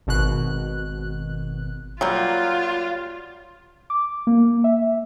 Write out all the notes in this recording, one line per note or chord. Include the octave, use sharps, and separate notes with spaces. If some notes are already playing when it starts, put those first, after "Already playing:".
G#1 B2 F#6
F#3 G3 A#3 F4
D6
A#3
E5